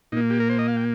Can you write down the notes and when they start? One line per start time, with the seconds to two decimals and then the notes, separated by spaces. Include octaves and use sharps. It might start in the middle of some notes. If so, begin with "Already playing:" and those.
0.12 A#2 A#3 D#4
0.30 G4
0.40 A#4
0.49 C5
0.58 D#5
0.68 F5
0.77 G5